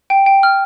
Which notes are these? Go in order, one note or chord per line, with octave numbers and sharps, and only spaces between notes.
G5
G5
F6